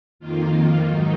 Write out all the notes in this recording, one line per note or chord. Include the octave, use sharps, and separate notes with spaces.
F2 D#3 A#3 F4
G#2 D#3 F#3 D#4